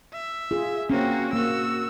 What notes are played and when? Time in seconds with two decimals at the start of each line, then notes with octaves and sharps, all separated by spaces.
0.13 E5
0.51 F4 G#4
0.90 A#3 C4 C#4 F#4
1.33 A#3 F#4 E6